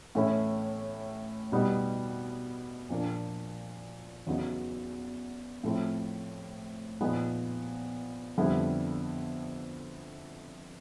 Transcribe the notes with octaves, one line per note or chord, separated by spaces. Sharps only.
A2 E3 A3 C#4 E4
B2 G3 B3 D#4
A#2 F3 A#3 D4
E2 C#3 F#3 B3 D#4
A2 F3 A3 C4 E4
A#2 F3 G#3 B3 D#4
F2 D3 G3 B3 E4